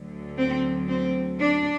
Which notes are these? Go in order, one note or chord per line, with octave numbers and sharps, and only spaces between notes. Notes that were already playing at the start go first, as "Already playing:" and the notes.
Already playing: D2 D3 F#3
C4
C4
D4